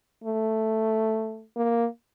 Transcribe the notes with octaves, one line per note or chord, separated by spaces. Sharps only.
A3
A#3